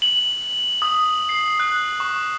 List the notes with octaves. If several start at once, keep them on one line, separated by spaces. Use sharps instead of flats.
F#7
D#6
C7
F#6
C#6